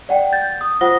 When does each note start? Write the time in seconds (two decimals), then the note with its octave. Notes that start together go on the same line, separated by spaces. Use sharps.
0.09 D5 F#5 G5
0.33 G6 A6
0.61 D#6
0.81 F4 C5 F#5 D#6 A#6 G7